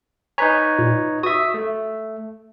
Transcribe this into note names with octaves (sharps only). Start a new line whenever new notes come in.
D#4 B4 C#5 G#5 A#5 B6
A#2
F#4 E5 D#6
A3